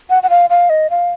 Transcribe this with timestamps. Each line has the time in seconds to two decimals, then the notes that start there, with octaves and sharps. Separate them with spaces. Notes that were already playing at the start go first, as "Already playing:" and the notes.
0.10 F#5
0.23 F#5
0.30 F5
0.50 F5
0.70 D#5
0.90 F5